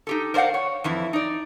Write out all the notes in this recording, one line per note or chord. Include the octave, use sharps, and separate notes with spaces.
D#4 G4 A4
A#4 C5 D5 F5 F#5
C#5
F2 E3 E4
D#4 D5